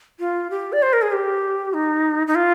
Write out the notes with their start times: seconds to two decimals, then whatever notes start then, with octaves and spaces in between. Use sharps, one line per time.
0.20 F4
0.50 G4
0.73 D5
0.83 C5
0.93 A#4
1.02 G#4
1.12 G4
1.74 D#4
2.27 D#4
2.35 F4